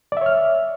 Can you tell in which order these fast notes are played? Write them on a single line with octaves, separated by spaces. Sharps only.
D5 E5 C#5 F6